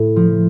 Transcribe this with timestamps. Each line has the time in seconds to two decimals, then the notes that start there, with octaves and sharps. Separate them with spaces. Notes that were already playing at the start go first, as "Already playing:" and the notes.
Already playing: A2
0.16 F3